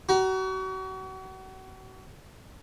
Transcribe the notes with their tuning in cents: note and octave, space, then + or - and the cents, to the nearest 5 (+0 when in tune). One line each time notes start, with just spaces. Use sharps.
F#4 +35 A#5 +20